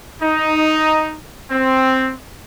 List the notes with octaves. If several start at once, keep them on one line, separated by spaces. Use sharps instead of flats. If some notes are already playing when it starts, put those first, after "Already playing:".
D#4
C4